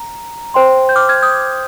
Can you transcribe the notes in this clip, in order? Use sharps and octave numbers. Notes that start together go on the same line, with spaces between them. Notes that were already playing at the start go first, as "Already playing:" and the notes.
Already playing: A#5
C5 G5 C6
G6
D6 F6
F6 G#6
D#6 G6